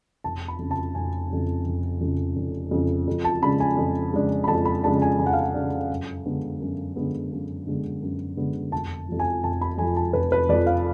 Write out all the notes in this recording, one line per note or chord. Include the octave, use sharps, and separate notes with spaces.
F1 A5
B5
F2 C#3
A5
F1 G#5
F2 C#3
F1
F2 C#3
F1
F2 C#3
F2
A5
C#3 G#3 D4 B5
G#5
F2
C#3 G#3 D4
B5
F2 A5
B5
C#3 G#3 D4 A5
G#5
F2 G#5
F#5
F5
F#5
C#3 G#3 D4
F#2
D3 G#3 B3
F#2
D3 G#3 B3
F#2
D3 G#3 B3
F#2
D3 G#3 B3
F1 A5
F2 F3
G#5
F1 A5
B5
F2 F3 G#5
A5
F1 B4
B4
F2 F3 D5
F5